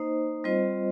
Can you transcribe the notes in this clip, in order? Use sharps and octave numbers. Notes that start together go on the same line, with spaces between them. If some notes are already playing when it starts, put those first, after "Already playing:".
Already playing: A#3 D#4 C5 D#5
G3 C4 F4 C5 D#5